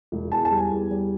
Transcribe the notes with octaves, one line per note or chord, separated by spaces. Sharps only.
E1
E2 A5
A5
G3
G#5
E2
G3